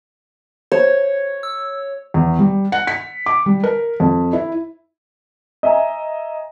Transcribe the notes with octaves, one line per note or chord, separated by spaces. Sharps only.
C5 C#5
E6
E2
G3
F#5
B6
D6
G3
A#4
F2
E4
D#5 E5 G#5 A#5